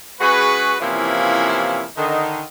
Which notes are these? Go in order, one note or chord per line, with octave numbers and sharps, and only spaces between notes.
G#3 C#4 F#4 G#4 B4
C3 E3 F3 A#3 C#4 E4
D3 D#3 D#4